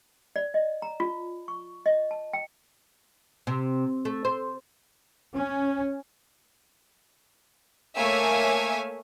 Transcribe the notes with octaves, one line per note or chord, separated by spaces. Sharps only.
D5
D#5
A#5
F4
C#6
D#5
A5
G5
C3
A3
C5
C#4
A3 A#3 C#5 E5 F5 G#5